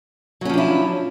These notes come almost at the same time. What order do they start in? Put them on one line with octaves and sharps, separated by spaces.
F#3 C#4 F3 D4 E4